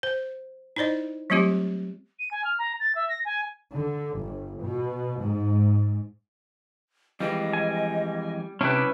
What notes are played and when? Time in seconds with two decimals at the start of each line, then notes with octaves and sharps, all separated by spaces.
0.03 C5
0.76 D#4 E4 C5 D5 D#5
1.30 F#3 G3 A3 C4 F4 G4
2.19 D#7
2.31 G#5
2.44 F6
2.58 A#5
2.80 A6
2.95 E5
3.09 A#6
3.25 G#5
3.73 D3
4.18 G1
4.62 B2
5.20 G#2
7.20 F2 E3 G3 G#3 D#5
7.53 G#5
8.61 C3 G3 C#4 D4 E4 B4